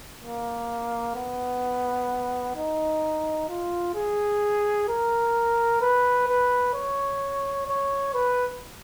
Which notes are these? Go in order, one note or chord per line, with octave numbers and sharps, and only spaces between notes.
A#3
B3
D#4
F4
G#4
A#4
B4
B4
C#5
C#5
B4